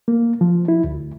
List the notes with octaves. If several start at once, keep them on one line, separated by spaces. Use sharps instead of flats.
A#3
F3
E4
D2